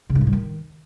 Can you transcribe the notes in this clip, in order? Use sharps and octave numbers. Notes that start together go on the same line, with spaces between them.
C#3
G2
A2
G3
D#3